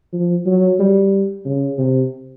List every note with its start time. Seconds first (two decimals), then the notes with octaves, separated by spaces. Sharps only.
0.13 F3
0.46 F#3
0.80 G3
1.45 C#3
1.78 C3